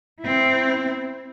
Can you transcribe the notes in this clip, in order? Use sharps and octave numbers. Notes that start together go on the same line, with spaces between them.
C4 E4